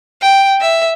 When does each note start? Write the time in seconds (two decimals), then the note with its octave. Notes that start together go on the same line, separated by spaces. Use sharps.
0.22 G5
0.61 E5